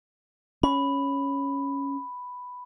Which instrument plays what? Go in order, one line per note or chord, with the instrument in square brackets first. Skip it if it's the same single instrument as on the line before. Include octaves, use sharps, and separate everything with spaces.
[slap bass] C#4 [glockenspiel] B5